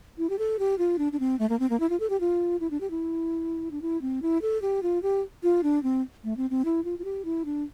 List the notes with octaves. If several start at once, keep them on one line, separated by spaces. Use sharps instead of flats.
E4
G4
A4
G4
F4
D4
D4
C4
A3
A#3
C4
A#3
E4
F4
A4
G4
F4
E4
D4
G4
E4
D4
E4
C4
E4
A4
G4
F4
G4
F4
D4
C4
A3
C4
C4
E4
F4
F4
G4
E4
D4